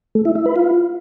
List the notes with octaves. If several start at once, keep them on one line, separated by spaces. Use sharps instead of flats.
A3
E4
E4
B4
F4